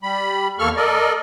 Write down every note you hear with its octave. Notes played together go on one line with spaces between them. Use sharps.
G3 B5
E2 A#3 A4 C#6 F6
A4 A#4 D5 D#5